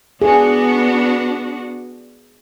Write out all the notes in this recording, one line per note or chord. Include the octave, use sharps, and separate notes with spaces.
B3 D4 F#4 G#4